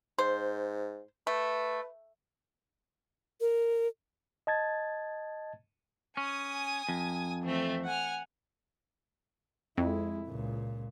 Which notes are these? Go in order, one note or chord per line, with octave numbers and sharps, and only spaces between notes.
G#2 C5
A3 B4
A#4
D#5 A5 G#6 A6
C#4 G#5 D#6
F2
E3 A3 C4
F#5 G#5 F6
F2 G#3 E4
C#2 A#2